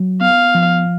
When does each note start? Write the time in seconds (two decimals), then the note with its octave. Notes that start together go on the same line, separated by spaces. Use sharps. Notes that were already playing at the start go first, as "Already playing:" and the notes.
Already playing: F#3
0.21 B3 F5
0.55 F3